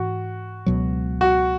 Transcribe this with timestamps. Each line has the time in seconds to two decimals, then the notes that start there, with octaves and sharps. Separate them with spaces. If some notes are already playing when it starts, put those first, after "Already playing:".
Already playing: G#2 E3 F#4
0.66 C#2 B2 F#3
1.21 F#4